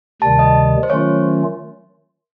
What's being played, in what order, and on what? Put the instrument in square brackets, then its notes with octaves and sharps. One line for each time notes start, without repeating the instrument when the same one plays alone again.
[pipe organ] D2 C3 D#3 G3 [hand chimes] A5
[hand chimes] D#5
C5
[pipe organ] D#3 F#3 A3 C#4 F4 [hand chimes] C#5